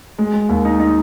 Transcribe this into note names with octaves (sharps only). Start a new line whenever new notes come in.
G#3
G#3
D#2
D#4
D#4